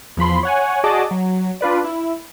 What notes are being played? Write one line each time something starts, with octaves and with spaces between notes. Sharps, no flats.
E2 F3 B5 C6
C#5 F#5 G#5
F#4 G#4 D5 D#5 A5 D6
F#3
D4 F4 B4 D5
E4